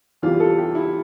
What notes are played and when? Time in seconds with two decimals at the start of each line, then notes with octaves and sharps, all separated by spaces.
0.22 E2 C3 E3 G3 F4
0.40 A4
0.58 G4
0.75 E4